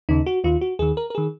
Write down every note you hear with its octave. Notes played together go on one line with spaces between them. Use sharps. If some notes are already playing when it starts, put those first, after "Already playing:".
D#2 C#3 D#4
F#4
D#2 D#3 F4
F#4
D#2 D#3 G#4
A#4
A#4
D#3 G#4